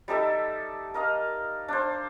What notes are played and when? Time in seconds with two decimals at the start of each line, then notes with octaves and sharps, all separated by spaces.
0.08 G3 D#4 A4 E5
0.94 A#4 D#5 F5
1.68 D4 C5